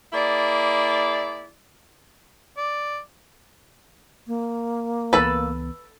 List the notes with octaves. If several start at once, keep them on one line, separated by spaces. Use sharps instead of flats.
A#3 E4 G#4 D5
D5
A#3
C#2 E3 B3 A4 B4 B5